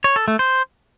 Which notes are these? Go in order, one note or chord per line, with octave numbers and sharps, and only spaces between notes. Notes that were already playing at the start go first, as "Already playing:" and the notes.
C#5
A4
A3
C5